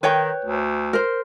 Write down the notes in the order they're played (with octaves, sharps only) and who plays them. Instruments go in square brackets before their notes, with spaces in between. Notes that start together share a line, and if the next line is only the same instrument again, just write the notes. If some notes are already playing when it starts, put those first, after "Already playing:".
[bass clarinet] D#3 [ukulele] B4 C#5 G5
[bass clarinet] D2
[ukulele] A#4 C5